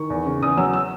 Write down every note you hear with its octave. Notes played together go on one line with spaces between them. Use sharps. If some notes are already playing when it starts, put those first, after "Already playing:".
Already playing: D#3 C#6
E2
C#3
E2 D#6
F#3 E6
E6